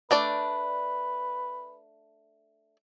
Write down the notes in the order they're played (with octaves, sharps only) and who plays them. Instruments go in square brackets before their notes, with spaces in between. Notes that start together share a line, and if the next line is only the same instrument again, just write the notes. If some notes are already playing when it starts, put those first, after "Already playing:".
[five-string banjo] A3 D4 D5 [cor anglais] B4